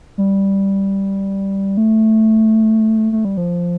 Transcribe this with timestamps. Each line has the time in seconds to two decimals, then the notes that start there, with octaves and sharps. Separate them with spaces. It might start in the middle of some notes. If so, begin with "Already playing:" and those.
0.18 G3
1.77 A3
3.12 A3
3.25 G3
3.37 F3